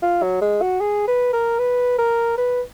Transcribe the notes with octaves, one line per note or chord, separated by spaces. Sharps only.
F4
F#3
G#3
F#4
G#4
B4
A#4
B4
A#4
B4